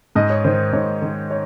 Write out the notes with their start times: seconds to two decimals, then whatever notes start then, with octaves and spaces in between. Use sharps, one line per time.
0.15 G#2 D#5
0.30 C#5
0.44 D#3 C5
0.73 G#2 C#5
1.02 D#3
1.31 C#5